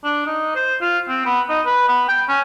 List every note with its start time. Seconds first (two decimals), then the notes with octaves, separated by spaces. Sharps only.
0.04 D4
0.27 D#4
0.55 C5
0.81 F4
1.08 C4
1.25 B3
1.49 D#4
1.66 B4
1.88 B3
2.08 G5
2.28 C#4